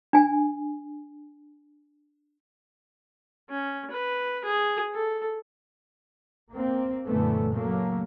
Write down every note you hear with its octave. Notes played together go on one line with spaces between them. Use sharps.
D4 G#5
C#4
B4
G#4
A4
A#3 C4
F#2 A#2 D3 E3 A3 B3
C#3 F#3 A3 A#3